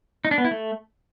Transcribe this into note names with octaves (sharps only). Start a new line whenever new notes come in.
D#4
D4
B3
E4
A3